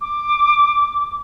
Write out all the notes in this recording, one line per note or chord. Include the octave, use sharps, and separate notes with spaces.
D6